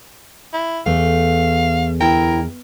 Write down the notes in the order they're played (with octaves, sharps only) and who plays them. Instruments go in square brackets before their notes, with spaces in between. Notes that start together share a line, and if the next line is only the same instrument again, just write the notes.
[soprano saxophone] E4
[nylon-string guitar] E2 [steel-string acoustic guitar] A3 [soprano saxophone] F5
[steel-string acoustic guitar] D2 E4 G5 [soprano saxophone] A#4